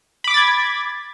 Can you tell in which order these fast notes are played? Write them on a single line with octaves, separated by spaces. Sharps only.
B5 D6 B6 A6 G#6